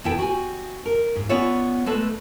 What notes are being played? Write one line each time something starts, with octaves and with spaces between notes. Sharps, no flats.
E2 B2 E4 A4 B4 G5
F#4 G4 G#5
A#4
G#2
B3 C#4 F4 C#5 D5 E5
G#3 A3 A4 B4